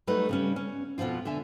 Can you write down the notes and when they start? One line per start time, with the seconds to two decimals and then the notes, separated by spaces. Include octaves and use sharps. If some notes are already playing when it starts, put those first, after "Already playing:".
0.07 F#3 G3 A3 D#4 A4 B4
0.29 C#3 G3 C#4
0.56 C#4
0.98 F2 B2 E3 F3 F4
1.25 D3 A4 E5 G#5